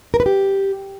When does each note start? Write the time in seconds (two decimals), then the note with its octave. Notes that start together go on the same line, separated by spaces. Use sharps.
0.14 A#4
0.20 B4
0.26 G4